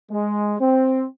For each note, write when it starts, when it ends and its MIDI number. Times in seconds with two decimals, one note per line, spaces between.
0.11 0.55 56
0.60 1.05 60